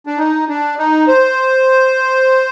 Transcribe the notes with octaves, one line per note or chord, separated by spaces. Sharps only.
D4
D#4
D4
D#4
C5